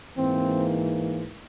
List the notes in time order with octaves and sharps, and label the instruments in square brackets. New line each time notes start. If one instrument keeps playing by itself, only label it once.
[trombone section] G#2 E3 A#3 C4